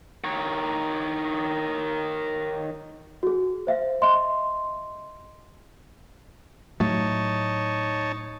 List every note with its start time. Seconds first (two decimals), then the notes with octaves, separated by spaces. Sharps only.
0.24 D#3 C#5
3.23 F#4 G#4
3.67 C5 E5 F5
4.02 D#5 E5 C6
6.80 A2 F#3 A3 D#4 C#5 A5